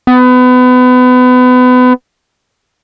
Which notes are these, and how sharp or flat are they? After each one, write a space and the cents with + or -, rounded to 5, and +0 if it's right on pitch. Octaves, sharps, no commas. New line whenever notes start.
B3 +30